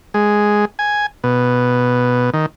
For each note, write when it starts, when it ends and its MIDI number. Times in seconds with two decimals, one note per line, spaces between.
0.14 0.65 56
0.79 1.06 80
1.24 2.30 47
2.33 2.46 51